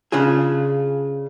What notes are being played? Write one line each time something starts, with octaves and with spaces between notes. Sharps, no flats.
C#3 D4 F4 G#4